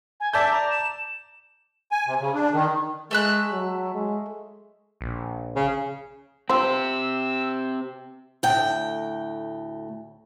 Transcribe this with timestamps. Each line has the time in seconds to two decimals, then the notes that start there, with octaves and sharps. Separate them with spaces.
0.20 G#5
0.33 D5 E5 A5 G6
0.51 A#5
0.71 E7
1.91 G#5
2.07 C3
2.19 C#3
2.34 D4
2.52 D#3
3.11 G#3 A3 E5 F#6
3.52 F#3
3.94 G#3
5.01 A#1
5.56 C#3
6.49 C4 F4 G4 C5 E6
8.43 D2 A2 G5